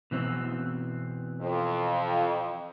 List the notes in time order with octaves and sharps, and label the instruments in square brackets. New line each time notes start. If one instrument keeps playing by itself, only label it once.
[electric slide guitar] B2 E3 C4
[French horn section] F2